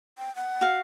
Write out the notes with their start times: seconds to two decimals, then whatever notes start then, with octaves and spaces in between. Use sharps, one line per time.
0.18 G5
0.36 F#5
0.61 F#4 F5